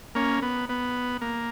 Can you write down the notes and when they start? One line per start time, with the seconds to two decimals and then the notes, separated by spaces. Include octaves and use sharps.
0.15 A#3 C#4
0.42 B3
0.69 B3
1.21 A#3